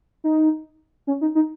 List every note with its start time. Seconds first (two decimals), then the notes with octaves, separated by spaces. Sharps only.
0.24 D#4
1.07 C#4
1.21 D#4
1.35 D#4